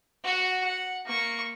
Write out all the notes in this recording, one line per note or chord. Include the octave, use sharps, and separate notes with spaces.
F#4 F#5
F#5
A#3 C#6